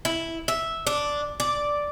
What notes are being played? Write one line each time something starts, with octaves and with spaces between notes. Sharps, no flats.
E4
E5
D4
D5